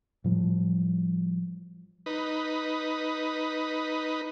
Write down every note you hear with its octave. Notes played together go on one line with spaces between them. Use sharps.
A2 F3 G3
D#4 B4